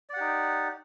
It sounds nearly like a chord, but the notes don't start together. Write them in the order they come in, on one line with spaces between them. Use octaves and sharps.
D5 F#5 G4 D#4